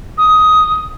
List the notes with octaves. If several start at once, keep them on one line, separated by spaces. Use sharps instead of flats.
D#6